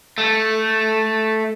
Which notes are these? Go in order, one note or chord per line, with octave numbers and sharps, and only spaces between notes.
A3